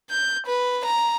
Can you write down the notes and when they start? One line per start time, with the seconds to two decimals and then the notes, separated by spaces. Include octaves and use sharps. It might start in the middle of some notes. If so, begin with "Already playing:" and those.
0.10 G6
0.46 B4
0.85 A#5